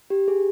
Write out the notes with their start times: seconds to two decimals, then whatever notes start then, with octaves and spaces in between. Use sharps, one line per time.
0.10 G4
0.28 G#4